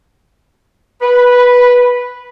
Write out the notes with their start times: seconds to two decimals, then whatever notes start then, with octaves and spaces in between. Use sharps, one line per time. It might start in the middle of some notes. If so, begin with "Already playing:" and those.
1.02 B4